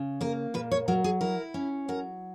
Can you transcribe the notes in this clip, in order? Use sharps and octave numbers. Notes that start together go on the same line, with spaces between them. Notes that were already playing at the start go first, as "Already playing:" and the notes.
Already playing: C#3
A#3 A#4
A#2 B4
C#5
F#3 A#4
G#4
E4 A#4
C#4
F#3 A#4